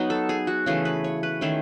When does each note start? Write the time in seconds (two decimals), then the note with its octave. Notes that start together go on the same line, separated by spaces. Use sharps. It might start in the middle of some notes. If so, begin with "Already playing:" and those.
Already playing: F#3 B3 D#4
0.10 A4
0.29 G#4
0.47 F#4
0.66 C#3 E3 A3 G#4
0.85 B4
1.04 C#5
1.23 B4
1.41 D#3 A3 C#4 E4 G#4